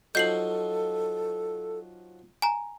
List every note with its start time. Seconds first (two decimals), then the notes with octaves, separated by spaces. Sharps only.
0.15 F3 F#3 D#4 A4 G6 C7 F#7
2.42 G#5 A#5